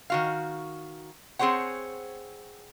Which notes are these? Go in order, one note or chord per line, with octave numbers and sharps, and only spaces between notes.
D#3 F#4 F5
C4 G#4 C5 C#5 F#5